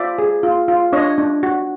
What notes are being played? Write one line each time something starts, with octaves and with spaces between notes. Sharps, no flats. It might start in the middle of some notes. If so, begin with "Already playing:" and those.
Already playing: F4 C5 D5 E5
G#4
F4
F4
D4 C#5 D#5
D4
F#4